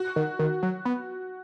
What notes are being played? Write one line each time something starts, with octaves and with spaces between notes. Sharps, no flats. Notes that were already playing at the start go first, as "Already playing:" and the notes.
Already playing: F#4
D#3
D#3
F#3
B3